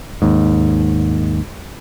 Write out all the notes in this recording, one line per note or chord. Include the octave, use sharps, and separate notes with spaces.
D#2 G#2